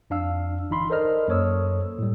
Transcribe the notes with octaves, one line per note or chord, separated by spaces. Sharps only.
F2 D4 F5 E6
G1 E3 D#4 B5 C6
A4 A#4 C5 D5 D#5 F6
F#2 A#3 A4 C#5 D#6 E6
A2 G3